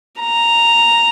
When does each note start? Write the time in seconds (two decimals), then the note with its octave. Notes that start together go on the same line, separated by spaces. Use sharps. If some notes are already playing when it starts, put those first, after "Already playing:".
0.19 A#5